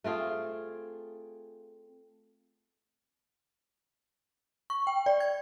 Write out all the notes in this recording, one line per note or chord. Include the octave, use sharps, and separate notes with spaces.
A3 C4 F4 G#4
C#6
G5
D5
G#6